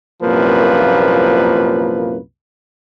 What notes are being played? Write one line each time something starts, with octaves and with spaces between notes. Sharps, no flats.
C2 F#2 A#2 F3 A#3 B4